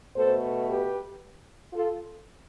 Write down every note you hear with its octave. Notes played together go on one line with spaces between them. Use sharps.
B2 A3 A4 C5
G4 B4
F4 A4